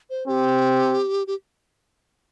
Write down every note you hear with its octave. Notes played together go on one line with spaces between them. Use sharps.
C5
C4 G4
G4